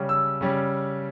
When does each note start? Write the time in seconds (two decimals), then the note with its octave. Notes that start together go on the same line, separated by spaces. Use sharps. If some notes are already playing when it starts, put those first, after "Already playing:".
Already playing: C#3 G3 C#4
0.09 E6
0.41 C#3 G3 C#4